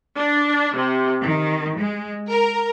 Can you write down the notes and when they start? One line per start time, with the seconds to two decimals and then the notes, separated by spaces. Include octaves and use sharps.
0.18 D4
0.77 C3
1.24 D#3
1.78 G#3
2.31 A#4